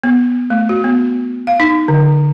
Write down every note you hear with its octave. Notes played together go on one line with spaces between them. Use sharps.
B3
A3
F#4
B3
F5
D#4
D3